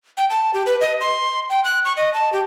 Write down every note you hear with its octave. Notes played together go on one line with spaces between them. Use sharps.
G5
A5
G4
B4
D#5
C6
G5
F#6
C#6
D#5
A5
G4